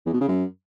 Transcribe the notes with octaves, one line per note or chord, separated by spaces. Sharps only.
E2
B2
C#3
F#2